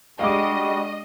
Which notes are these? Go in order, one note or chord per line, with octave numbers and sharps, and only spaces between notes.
G3 G#3 D4 F#4 G4 D#5 F5 D6